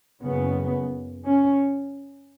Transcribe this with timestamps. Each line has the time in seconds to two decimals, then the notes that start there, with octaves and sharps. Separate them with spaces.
0.20 F#1 F#2 C#3 B3
1.24 C#4